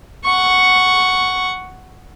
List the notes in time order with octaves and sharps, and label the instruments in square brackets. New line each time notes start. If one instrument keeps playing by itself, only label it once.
[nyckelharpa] F#5 C#6